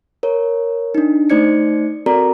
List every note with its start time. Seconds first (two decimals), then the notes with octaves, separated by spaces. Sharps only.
0.23 A#4 C#5
0.95 D4 D#4
1.30 A3 D#4 C5 D5 G#6 C#7
2.06 C4 F#4 A4 A#4 D5 A#5